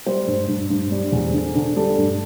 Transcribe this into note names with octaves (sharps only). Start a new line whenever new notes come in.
G3 C5
G2
G2
G2
G3
E2
D3
D3
G3 A4
G2